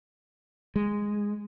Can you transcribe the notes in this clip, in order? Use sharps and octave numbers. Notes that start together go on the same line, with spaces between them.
G#3